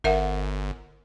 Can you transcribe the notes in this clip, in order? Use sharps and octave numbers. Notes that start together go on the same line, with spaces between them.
G1 A#4 E5 F#5